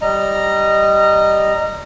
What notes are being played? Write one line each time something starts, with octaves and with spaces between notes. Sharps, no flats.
G3 D#5 A#5